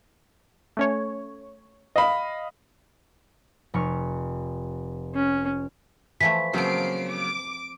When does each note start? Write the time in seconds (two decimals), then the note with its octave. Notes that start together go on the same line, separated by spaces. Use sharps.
0.77 A3 C#4 C#5
1.96 D#5 F5 B5
3.74 F1 C#6 F6
5.15 C#4
6.21 E3 F3 A3 B6
6.53 C#3 F3 F#3 A#3 C4 C7 D7
7.08 D6